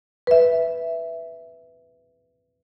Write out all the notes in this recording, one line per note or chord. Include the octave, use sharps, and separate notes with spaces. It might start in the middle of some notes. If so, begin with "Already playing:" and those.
B4 E5